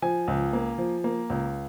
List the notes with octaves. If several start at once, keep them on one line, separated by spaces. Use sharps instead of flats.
F3 G#5
C#2
A#3
F3
A#3
C#2